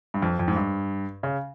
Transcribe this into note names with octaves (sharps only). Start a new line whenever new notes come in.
G2
F2
F2
G#2
G2
C#3